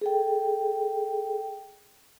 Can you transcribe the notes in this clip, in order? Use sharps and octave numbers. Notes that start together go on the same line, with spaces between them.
G#4 A4 G5